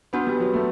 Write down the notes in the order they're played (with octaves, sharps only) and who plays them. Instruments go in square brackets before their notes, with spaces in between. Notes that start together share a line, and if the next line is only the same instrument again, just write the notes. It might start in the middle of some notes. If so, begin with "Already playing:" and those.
[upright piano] B3 [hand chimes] D4 F#4 B4
[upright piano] G3
F#3
A3